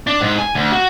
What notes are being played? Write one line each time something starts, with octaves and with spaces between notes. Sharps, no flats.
D4
G#2
G#5
D2
F#4